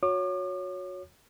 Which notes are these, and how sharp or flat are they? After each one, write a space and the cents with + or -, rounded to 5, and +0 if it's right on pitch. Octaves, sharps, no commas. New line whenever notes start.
F#4 -25 C#5 +0 D6 +45